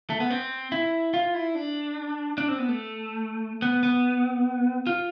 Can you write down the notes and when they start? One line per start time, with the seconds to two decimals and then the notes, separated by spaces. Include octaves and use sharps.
0.10 A3
0.20 B3
0.30 C4
0.72 E4
1.14 F4
1.34 E4
1.55 D4
2.38 D4
2.48 C4
2.58 B3
2.68 A3
3.62 B3
3.83 B3
4.87 F4